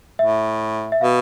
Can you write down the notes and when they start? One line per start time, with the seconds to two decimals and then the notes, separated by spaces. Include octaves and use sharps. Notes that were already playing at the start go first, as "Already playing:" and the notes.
0.18 A2 E5
0.92 E5
1.01 B2 F5